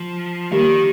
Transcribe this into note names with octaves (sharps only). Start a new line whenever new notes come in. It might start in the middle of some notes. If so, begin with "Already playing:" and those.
Already playing: F3
D#3 G3 A#3